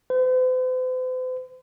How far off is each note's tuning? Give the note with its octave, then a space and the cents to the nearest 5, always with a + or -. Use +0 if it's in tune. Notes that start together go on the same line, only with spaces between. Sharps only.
C5 -45